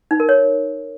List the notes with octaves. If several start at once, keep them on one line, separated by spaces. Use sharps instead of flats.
D#4
A#4
C#5